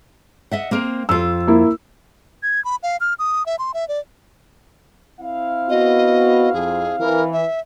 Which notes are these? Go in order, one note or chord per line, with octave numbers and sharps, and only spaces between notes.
D#5 E5 F#5
A#3 C4 A#4
F2 F4 E6
A#3 E4
G#6
B5
F5
F6
D#6
E5
C6
E5
D5
C4 E4 F5
B3 F#4 D#5
F2 G#4
E3 A#4
E5